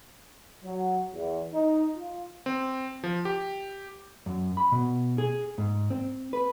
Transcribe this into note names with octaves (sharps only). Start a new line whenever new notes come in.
F#3
E2
D#4
F4
C4
F3
G4
F#2
B5
B2
G#4
G#2
C4
B4